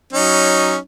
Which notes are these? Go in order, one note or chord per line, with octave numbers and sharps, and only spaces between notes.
F#3 C#4 D#4